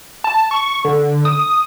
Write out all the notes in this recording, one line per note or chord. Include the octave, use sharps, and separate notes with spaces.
A5
C#6
D3
D#6